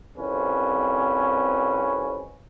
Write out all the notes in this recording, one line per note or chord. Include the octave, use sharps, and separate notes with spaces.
C2 F2 C#4 B4